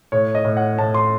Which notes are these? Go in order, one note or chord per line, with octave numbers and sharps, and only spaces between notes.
A2 C#5
D#5
A2
F#5
A2 A5
C6